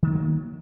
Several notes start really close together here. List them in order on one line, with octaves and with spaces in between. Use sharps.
D#3 G#3 F#3 A#3